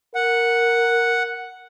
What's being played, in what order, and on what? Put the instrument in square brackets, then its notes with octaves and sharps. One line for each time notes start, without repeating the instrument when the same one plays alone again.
[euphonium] A#4 [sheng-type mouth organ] F#5